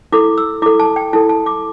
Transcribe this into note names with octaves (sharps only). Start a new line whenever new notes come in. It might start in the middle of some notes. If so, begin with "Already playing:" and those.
E4 A4 D6
E6
E4 A4 D6
A5
G5
E4 A4 A5
A5
D6